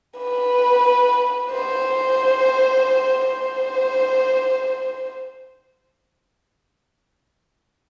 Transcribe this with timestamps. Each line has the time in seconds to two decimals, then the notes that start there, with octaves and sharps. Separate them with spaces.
0.18 B4
1.51 C5
3.27 C5